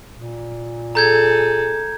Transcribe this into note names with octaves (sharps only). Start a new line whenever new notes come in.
A#2
G#4 A4 A#5 G6 G#6